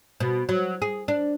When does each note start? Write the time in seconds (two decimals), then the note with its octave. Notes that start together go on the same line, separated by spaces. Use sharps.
0.20 B2
0.49 F#3
0.82 G#4
1.08 D4